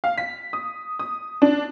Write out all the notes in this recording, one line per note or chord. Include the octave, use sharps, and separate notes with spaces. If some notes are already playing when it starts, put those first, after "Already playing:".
F5
B6
D#6
D#6
D4